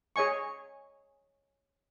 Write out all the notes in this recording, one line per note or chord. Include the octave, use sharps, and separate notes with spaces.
G#4 C#5 D#5 G#5 C#6